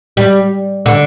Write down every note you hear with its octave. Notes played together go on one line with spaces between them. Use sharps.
G3
D3